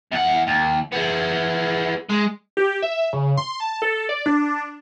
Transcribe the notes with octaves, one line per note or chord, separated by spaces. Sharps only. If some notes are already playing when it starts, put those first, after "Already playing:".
E2 F#5
D#2
B3 G#4
G#3
G4
E5
C#3
C6
A5
A4
D5
D4